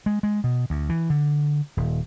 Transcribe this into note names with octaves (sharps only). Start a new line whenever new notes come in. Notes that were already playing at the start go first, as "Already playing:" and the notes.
G#3
G#3
B2
D2
E3
D3
D#1